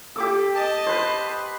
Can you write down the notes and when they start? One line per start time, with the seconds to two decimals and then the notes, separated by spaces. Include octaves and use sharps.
0.16 G4 A4 D6 E6
0.55 D#5 A5
0.86 B4 C5